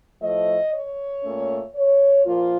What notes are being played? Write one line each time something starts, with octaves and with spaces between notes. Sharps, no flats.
A2 F3 A3 D#5
C#5
A#2 A3 C#4
C#5
A#2 F3 A#3 F4